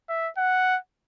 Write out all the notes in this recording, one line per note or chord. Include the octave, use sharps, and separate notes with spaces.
E5
F#5